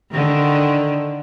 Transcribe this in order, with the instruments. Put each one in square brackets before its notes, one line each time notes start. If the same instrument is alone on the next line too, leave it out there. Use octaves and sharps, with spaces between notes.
[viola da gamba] D3 D#3